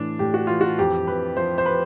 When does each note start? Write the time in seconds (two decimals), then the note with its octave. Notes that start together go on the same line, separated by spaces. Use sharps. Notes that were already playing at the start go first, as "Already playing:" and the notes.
Already playing: A2 E3 D4
0.19 A2 G4
0.34 F#4
0.47 E3 F4
0.61 F#4
0.79 F2 G4
1.07 F2 B4
1.37 F3 C5
1.58 C5
1.66 B4